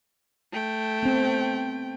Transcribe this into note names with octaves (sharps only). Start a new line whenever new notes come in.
A3 G5
B3 C4